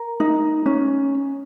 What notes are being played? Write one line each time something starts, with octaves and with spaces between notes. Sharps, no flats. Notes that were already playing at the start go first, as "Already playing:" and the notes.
Already playing: A#4
D#4
C#4